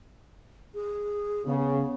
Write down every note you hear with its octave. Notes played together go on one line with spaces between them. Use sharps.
G#4
C#3 B3